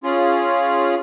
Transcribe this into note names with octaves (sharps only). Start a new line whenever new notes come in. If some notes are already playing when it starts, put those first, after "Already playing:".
C#4 F4 G#4